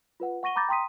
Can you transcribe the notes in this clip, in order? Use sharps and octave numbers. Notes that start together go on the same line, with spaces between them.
F4 B4 F#5
F#5 C#6 A#6 D#7 G7
A#5 B5 D6 G6 A6 A#6
G5 A#5 C6 D#6 B6 D#7